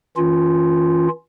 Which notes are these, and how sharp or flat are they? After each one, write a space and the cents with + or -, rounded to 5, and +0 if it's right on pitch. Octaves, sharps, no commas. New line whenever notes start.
E3 -35 C#4 +10 F4 +0